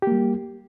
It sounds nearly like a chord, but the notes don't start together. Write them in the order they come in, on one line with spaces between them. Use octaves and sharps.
G4 A#3 G3